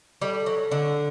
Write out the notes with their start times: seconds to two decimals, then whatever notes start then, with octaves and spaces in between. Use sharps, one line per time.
0.21 G3 A4
0.46 F#3
0.72 D3